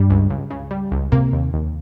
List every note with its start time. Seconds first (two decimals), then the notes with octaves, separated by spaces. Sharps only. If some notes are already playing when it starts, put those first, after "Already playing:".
Already playing: G2 G3
0.10 C#2
0.30 C#2
0.50 C#3
0.71 G3
0.92 C#2
1.12 C3 A#3
1.33 D#2
1.53 D#2